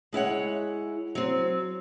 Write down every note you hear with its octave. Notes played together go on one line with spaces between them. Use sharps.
G#3 E4 C#5 F#5
F#3 C4